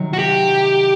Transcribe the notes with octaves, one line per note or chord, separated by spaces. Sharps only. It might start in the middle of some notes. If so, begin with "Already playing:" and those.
Already playing: C3 D#3 F#3
F#4
G4